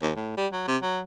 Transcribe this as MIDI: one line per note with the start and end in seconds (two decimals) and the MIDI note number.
0.02 0.11 39
0.16 0.36 45
0.37 0.47 55
0.52 0.63 54
0.68 0.77 48
0.83 1.01 54